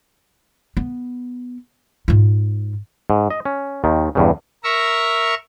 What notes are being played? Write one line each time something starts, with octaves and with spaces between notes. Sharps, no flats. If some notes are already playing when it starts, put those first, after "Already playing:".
B3
G#2 F4
G#2
D#5
C#4
D#2 D#3
E2 G2 C#3
A#4 E5 A#5 C#6 E6